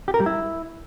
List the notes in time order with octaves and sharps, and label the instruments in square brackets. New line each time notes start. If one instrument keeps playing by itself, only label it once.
[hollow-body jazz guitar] G4
A#4
G3
E4